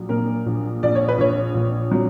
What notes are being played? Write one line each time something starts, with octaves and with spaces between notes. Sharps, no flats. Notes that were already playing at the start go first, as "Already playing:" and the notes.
Already playing: A#1 F#3
A#2 A#4
A#1
A#1 D5
C#5
B4
A#1 C#5
A#1
F#3